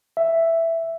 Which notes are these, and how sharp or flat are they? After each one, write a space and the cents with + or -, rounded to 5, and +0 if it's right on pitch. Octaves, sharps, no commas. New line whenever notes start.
E5 +5